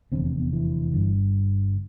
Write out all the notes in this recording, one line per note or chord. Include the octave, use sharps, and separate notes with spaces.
F1 E2 D3 C4
C4
B3
E3
G1 G2 D3